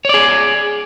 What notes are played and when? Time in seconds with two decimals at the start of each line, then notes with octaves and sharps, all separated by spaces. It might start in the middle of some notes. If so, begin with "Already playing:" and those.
0.05 C#5
0.09 D5
0.14 G#4